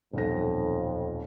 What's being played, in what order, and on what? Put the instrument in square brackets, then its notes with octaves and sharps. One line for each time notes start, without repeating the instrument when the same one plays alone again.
[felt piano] D#1 B1 A#6 [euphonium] F2